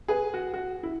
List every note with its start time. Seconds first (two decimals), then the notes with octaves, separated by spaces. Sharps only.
0.08 G#4 B4
0.34 F#4
0.54 F#4
0.83 E4